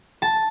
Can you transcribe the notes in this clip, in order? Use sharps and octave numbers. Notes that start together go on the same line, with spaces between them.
A5